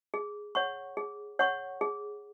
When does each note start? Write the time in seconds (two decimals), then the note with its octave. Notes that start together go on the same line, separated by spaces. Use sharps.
0.14 G#4
0.55 C#5 F#5 C#6
0.97 G#4
1.39 C#5 F#5 C#6
1.81 G#4